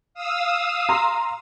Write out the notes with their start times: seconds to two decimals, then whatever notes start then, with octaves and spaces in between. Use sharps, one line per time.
0.14 F5 D#6 E6
0.89 A#5 C6